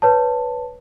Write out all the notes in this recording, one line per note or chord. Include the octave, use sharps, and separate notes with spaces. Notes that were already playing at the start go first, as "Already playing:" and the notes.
B4 C#5 A5